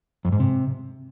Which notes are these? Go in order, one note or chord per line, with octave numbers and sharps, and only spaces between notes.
F2
G#2
C3